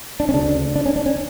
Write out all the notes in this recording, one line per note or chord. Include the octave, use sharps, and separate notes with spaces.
D4
C#4
D2 C#3 D4
D4
C#4
D4
C#4